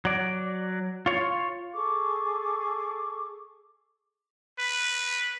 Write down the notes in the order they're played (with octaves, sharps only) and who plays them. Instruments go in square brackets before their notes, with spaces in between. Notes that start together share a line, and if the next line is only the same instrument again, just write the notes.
[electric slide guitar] F#3 D5
F4 C#5
[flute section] G#4 A4 C#6 D6
[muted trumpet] B4